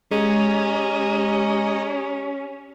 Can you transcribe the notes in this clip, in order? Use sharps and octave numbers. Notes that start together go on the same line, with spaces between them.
G#3 C#4 G4 G#4 D#5 A#5